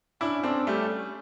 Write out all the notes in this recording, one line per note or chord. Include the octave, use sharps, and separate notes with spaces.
C#4 D4 E4
C4 D4 A4
G3 A3 C#4